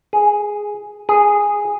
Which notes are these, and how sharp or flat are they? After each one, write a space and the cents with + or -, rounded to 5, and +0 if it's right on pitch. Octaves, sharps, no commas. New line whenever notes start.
G#4 +0
G#4 -10